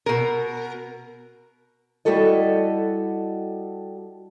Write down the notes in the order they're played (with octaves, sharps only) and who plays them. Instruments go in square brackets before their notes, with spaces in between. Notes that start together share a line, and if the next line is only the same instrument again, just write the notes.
[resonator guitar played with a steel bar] B2 A#4
[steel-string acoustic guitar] G3 E4 F#4 A4 D#5